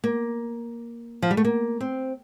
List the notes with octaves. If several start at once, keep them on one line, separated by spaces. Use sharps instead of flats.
A#3
F3
G3
A3
A#3
C4